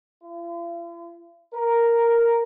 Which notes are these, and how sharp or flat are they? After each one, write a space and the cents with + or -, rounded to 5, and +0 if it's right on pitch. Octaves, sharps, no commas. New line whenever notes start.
F4 -45
A#4 +0